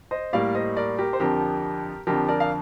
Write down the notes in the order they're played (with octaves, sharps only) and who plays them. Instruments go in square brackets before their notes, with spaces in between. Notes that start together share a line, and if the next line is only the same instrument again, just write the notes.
[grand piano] C5 D#5
A2 G3 A#3 D5 F5
C5 D#5
A#4 D5
G4 A#4
C5
F2 D3 F3 G4 A#4
F2 D3 F3 G4 A#4
A#4 D5
F5